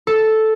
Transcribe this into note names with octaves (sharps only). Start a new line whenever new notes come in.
A4